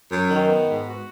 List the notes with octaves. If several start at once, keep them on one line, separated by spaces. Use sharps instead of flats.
F#2
D#3
B3
G#2
F#4